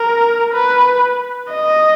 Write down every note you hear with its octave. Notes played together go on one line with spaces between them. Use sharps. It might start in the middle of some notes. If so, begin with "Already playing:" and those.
Already playing: A#4
B4
D#5